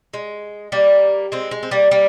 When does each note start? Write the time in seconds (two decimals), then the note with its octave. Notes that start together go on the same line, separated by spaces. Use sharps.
0.14 G#3
0.72 G3 A#3
1.32 G#3 C4
1.51 G#3
1.63 C4
1.71 G3 A#3
1.91 G3 A#3